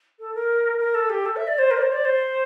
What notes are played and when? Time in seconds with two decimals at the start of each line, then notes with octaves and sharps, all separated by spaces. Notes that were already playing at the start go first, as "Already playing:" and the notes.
0.19 A4
0.35 A#4
0.79 A#4
0.94 A4
1.09 G4
1.25 A4
1.36 E5
1.47 D5
1.58 C5
1.70 A#4
1.77 D5
1.81 C5
1.92 D5
2.04 C5